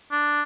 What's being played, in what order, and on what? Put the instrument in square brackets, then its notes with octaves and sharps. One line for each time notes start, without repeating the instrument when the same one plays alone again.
[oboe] D4